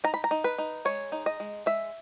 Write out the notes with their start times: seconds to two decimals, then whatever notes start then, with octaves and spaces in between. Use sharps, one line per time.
0.04 D#4 A#5
0.14 B5
0.24 A#5
0.31 D#4
0.44 B4
0.58 D#4
0.85 G#3 C#5
1.12 D#4
1.26 D#5
1.40 G#3
1.66 G#3 E5